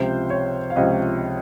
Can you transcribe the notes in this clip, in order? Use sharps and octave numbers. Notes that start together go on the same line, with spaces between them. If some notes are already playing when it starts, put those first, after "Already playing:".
Already playing: C#2 C3 F3 C5
C#5
F5
C#2 C3 F3 D#5